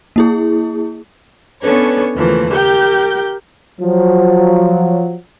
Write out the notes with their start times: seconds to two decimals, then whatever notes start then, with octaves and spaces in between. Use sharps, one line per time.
0.16 A#3 E4 G#4
1.62 B3 C#4 D4 A4 B4 C#5
2.17 D#2 C#3 E3 F3 A3 A#3
2.53 G4 A#4 G5 G6
3.81 F3 F#3